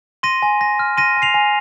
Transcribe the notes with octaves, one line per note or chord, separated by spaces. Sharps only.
C6 A#6 D#7
G#5
G#5 A#6
F6
C6 A#6 D#7
G#5
C7 F7
G#5